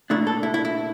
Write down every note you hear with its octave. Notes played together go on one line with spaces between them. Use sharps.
A#2 A3 D4 E4
A4
E4
E4
E4